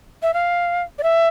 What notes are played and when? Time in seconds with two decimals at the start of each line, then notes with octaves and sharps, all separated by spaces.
0.23 E5
0.34 F5
0.99 D5
1.03 E5